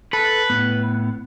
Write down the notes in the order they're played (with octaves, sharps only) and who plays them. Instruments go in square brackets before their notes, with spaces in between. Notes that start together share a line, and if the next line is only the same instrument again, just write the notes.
[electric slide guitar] A4 [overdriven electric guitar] B4
[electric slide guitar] A2 B3